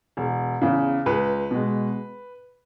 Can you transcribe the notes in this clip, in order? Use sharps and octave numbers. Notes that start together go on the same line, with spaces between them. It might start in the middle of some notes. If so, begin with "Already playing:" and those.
E1
E2 C#3
C#2 B4
B2 G#3